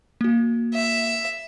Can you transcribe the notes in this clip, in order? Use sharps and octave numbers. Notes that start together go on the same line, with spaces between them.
A#3 F#4
E5